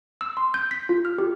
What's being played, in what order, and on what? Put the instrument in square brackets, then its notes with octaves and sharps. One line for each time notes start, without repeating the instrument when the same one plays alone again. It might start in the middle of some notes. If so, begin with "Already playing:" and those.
[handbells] E6
C6
G6
B6
F4
F6
G4